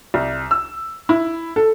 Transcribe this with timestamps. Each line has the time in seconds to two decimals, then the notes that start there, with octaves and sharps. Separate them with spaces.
0.14 C2
0.51 E6
1.09 E4
1.56 A4